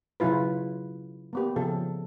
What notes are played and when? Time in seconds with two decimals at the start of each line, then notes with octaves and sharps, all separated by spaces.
0.20 C#3 F#3 E4 F4 B4
1.33 A#3 B3 G4
1.56 C#3 F3 A4